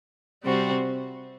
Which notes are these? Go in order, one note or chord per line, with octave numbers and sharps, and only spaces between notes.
C3 G3 C4 F#4